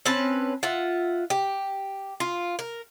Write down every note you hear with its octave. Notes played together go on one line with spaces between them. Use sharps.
C4 C#4 B4 A5
F4 E5 F#5
G4
F4
A#4